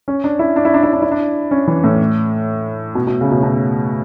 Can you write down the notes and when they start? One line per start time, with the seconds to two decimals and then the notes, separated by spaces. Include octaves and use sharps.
0.08 C#4
0.24 D4
0.39 E4
0.56 D4
0.65 E4
0.74 D4
0.83 E4
0.93 D4
1.02 E4
1.11 D4
1.51 C#4
1.67 E3
1.84 A2
2.95 B2
3.07 B2
3.21 C#3
3.31 B2
3.43 B2